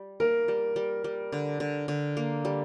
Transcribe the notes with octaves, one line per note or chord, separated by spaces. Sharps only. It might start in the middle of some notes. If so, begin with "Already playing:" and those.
Already playing: G3
A#3 A#4
G3
G3
G3
D3
D3
D3
A#3
G3